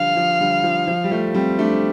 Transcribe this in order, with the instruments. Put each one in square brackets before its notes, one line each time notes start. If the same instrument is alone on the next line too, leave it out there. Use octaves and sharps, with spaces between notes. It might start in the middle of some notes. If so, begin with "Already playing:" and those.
Already playing: [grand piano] D3 F3 G3 [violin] F5
[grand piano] F3
D3 G3
F3
F3
G3
F3 A3
G3 C4
A3 D4